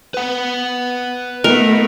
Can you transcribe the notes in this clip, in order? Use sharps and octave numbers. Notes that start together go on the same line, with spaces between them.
B4 F#5
A3 B3 D#4 A#4